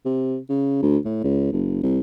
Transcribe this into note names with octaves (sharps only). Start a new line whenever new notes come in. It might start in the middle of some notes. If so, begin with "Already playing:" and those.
C3
C#3
D2
A2
C#2
F#1
C2